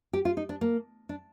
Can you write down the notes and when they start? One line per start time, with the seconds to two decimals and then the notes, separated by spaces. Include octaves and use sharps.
0.13 G4
0.25 F4
0.37 D#4
0.49 D4
0.61 A#3
1.09 D4